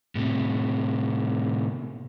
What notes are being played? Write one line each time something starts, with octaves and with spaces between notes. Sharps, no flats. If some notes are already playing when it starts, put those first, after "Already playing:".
A2 C3